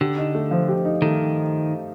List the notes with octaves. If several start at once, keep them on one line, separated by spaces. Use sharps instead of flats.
D3 G4
D#4
A3
F3
G4
D#4
D#3 A3